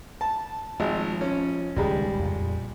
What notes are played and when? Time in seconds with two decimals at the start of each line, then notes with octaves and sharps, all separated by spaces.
0.21 A5
0.80 G#1 F3
1.21 C#4
1.76 D#1 C#2 D#3 G3 G#3
2.20 F2 A#2